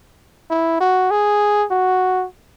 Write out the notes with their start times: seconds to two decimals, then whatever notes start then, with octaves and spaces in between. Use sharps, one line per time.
0.50 E4
0.80 F#4
1.11 G#4
1.71 F#4